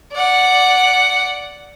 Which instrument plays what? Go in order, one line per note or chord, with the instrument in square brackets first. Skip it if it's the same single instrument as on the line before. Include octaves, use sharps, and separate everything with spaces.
[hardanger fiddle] D5 F#5